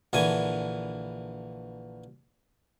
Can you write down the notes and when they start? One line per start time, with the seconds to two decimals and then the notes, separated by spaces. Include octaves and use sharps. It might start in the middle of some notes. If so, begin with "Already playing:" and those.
0.13 A#1 D3 E3 G#5